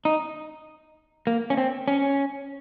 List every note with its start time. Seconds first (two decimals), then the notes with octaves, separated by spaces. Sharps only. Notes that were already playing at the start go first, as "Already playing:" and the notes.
0.05 D#4
1.27 A#3
1.50 C#4
1.57 C4
1.88 C#4